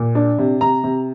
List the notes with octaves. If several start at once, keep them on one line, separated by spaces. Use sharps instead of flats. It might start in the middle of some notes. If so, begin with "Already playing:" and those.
Already playing: A#2
D4
C3
C3 A#5
C3